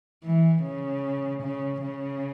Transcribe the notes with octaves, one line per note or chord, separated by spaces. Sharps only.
E3
C#3
C#3
C#3